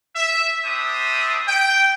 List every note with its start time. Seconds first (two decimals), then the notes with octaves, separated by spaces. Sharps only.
0.16 E5
0.64 G3 D4 C5 E5 D#6
1.47 G5